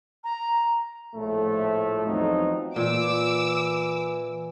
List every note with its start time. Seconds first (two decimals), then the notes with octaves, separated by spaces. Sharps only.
0.24 A#5
1.15 A#1 A2 F3 A3
2.07 E2 F3 F#3 C4 D#4
2.76 A#2 E3 D6 E6